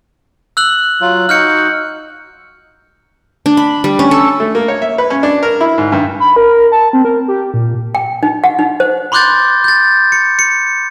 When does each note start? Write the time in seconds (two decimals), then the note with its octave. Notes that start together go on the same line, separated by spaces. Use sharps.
0.57 E6 F#6 F#7
1.01 F#3 F4
1.29 D#4 F#4 F6 G6 C#7
3.46 D4
3.57 B5
3.84 G3
3.99 C#4
4.11 A4
4.40 A3
4.55 A#3
4.68 C#5
4.82 E5
4.98 B4
5.10 C#4
5.23 D4
5.43 A#4
5.61 E4
5.78 G#2
5.92 G2
6.20 B5
6.36 A#4
6.72 A5
6.93 C4
7.05 A#4
7.28 G4
7.54 A#2
7.95 G5
8.23 D#4
8.44 F#5
8.59 D#4
8.80 C5
9.12 B5 C6 D6 F#6 G6 A6
9.64 G6 A6
10.12 C#7
10.39 C#7